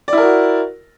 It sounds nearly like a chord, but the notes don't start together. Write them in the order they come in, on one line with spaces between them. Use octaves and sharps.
D5 E4 A#4 F#4